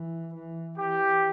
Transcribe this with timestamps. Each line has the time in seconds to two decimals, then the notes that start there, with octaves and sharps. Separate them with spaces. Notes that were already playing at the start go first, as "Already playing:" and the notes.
Already playing: E3
0.34 E3
0.78 E3 G4